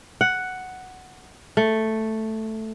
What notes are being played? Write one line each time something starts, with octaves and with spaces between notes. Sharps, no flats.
F#5
A3